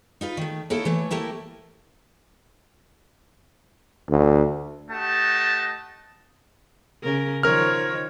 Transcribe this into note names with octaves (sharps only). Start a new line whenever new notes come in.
D#4 F4 B4
D#3 A3
A#3 D#4 E4 A4 C#5
E3 A3 C#5
A3 A#3 E4 G4
D2
A3 G4 D#5 F#5 A5
C#3 A#4
D#3 F3 A#4 C#5 F6